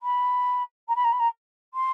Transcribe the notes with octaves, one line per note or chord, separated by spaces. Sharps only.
B5
A#5
B5
A#5
B5
A#5
C6